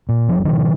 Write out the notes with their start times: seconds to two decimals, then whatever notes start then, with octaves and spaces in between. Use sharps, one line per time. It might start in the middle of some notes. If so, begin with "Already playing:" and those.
0.09 A#2
0.29 F#1 F3
0.37 F#3
0.45 B2 D#3 F3